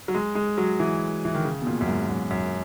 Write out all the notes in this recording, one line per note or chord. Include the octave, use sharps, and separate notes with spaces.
F#3
G#3
G#3
F#3
E3
E3
D#3
C#3
B2
A#2
F#2
G#2
F#2
F#2